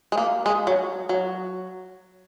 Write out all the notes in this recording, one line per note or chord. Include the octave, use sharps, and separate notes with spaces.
G#3
A#3
G#3
F#3
F#3